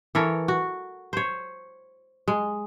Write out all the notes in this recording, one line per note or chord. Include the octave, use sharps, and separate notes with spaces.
E3 A4 A#4 C#5
F#4
C5 C#5
G#3